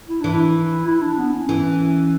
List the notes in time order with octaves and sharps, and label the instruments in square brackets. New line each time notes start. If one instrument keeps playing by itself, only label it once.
[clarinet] E4
[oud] E3 [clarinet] D4
[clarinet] E4
E4
D4
B3
C#4
[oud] E3